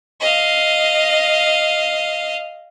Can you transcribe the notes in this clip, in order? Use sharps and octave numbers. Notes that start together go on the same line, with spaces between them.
D#5 F5